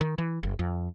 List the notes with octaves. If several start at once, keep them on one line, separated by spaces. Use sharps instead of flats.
D#3
E3
F#1
F2